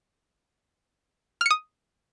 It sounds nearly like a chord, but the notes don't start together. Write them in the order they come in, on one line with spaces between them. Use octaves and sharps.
F6 C#7 D#6